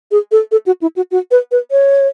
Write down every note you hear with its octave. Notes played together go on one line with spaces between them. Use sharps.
G#4
A4
A4
F#4
E4
F#4
F#4
B4
B4
C#5